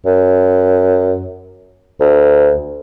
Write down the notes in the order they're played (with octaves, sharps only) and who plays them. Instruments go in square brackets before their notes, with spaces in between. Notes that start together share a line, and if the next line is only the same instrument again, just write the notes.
[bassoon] F#2
D2